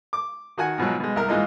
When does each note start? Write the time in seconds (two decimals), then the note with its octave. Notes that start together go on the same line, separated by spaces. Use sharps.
0.13 D6
0.58 D#3 F#4 F#5 G#5
0.78 G#2 B2 F3 F#3
1.00 B2 G#3
1.16 C2 A#4
1.29 G#2 E3 G#3 A#3 D#4 F4